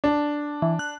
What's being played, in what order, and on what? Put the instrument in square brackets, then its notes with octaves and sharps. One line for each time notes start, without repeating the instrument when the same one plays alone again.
[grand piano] D4
[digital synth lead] E3
F#6